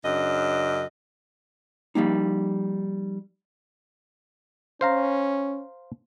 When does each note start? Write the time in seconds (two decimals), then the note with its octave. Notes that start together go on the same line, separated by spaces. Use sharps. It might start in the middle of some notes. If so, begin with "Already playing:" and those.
0.04 F#2 C#3 D4 D#5
1.95 F3 G3 G#3 A#3 D#4
4.81 C#4 C5 F5 A#5